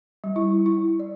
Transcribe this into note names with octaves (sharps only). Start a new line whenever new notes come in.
G3
E4
E4
D5